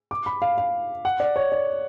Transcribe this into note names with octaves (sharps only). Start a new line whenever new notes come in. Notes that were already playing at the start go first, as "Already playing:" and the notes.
D6
B5
F5
F5
F#5
D5
C#5
D5